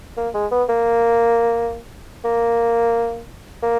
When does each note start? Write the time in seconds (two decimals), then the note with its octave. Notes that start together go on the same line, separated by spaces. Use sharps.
0.17 A#3
0.34 G#3
0.51 B3
0.69 A#3
2.25 A#3
3.63 A#3